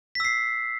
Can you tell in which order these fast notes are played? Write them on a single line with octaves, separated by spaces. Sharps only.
B6 E6 C7